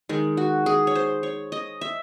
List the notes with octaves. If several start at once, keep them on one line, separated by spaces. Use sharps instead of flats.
D#3 G#3
F#4
G#4
C#5
C5
C#5
D#5
E5